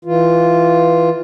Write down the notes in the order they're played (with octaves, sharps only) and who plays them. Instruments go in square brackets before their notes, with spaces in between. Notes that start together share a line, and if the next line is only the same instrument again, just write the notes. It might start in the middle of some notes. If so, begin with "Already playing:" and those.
[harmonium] E3 F4